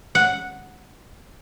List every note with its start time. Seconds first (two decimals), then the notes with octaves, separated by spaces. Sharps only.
0.15 F#5